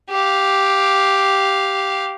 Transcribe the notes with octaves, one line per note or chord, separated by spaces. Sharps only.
G4 F5